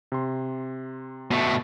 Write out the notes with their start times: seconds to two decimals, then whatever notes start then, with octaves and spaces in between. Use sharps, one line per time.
0.12 C3 C6
1.31 B2 A3